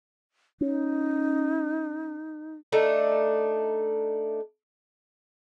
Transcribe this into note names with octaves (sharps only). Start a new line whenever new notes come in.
C#4 D#4
A3 D4 D#4